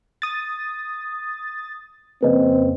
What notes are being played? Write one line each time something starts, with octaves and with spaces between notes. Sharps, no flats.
D#6 A6
F2 C#3 A#3 C4 B4 D#5